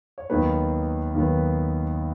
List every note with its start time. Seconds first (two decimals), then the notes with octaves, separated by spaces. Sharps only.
0.18 C#5
0.30 D#2 D#3 F#3 B3 B4
1.14 D#2 D#3 F#3 B3